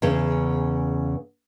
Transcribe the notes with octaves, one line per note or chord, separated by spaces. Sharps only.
E2 C#3